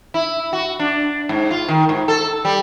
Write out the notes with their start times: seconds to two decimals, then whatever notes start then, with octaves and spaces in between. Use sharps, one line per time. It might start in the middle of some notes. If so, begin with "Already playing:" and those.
0.14 E4
0.53 F#4
0.80 D4
1.29 G#2
1.51 F4
1.68 D#3
1.89 G#2
2.08 A4
2.45 G3